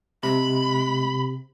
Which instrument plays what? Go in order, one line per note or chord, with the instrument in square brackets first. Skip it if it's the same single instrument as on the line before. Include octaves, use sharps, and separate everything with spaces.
[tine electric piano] C3 [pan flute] G#3 [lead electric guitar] B5